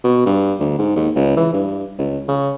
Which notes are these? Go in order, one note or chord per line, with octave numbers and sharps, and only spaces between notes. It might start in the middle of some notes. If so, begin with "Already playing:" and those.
B2
G2
D2
G#2
D#2
C#2
E3
G2
C#2
C#3